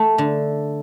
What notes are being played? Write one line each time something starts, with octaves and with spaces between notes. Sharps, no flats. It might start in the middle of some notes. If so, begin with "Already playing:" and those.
Already playing: A3
D3